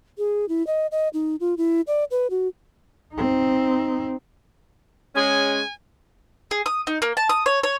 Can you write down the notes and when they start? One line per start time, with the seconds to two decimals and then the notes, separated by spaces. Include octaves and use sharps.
0.18 G#4
0.49 E4
0.67 D#5
0.92 D#5
1.13 D#4
1.40 F4
1.58 E4
1.87 D5
2.11 B4
2.30 F#4
3.14 C4 D#4
5.15 G#3 C#4 G#5
6.51 G#4
6.66 D#6
6.87 D#4
7.02 A#3
7.17 A5
7.29 D#6
7.46 C#5
7.63 C#5